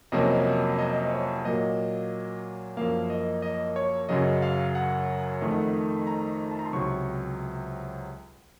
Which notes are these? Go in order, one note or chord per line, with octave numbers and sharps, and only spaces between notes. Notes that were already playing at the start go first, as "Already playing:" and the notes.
F2 C3 F#3 A#3 C#4 D#5
D#5
C#5
A#2 F#3 A#3 D#5
F#2 F3 A#3 F5
D#5
D#5
C#5
F#2 C#3 F#3 D#5
F5
F#5
F2 D#3 A3
A#5
A5
A#5
C6
C#2 C3 F#3 C#6